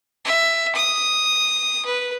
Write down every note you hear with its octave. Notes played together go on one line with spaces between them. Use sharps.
E5
D#6
B4